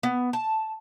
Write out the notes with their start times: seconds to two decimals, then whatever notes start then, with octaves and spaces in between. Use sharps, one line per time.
0.03 B3
0.33 A5